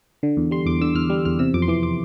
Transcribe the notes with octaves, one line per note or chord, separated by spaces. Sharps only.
D3
E2
G3 C6
E2 D6
D3 E6
E2 F6
G3
E2 F6
C3 E6
F2 D6
C6
E3 D6
D6